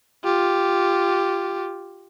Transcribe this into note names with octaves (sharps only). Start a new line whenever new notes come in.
F4 G4